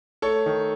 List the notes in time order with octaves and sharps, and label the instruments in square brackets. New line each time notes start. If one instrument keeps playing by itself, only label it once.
[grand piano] A3 A4 C#5
D#3